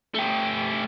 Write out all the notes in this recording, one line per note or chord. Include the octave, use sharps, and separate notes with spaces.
A3 G4